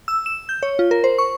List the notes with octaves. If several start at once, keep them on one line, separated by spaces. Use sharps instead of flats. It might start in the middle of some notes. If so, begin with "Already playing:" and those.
E6
E7
G6
C#5
F4
A#4
C5
C#6